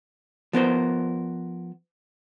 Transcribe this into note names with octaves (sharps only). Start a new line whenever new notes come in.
F3 B3 A#4 C5